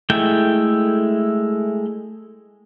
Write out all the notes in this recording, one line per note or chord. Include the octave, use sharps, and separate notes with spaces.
G#3 A3 E4 G5 G6